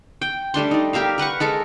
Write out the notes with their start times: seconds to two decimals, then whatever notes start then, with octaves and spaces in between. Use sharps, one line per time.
0.22 G5
0.54 G3 A3 D4 C6
0.71 D#4 D5
0.93 G4 A#4 E5 F5
1.18 A#4 B4 F#5 C#6
1.40 G#3 A4 A#4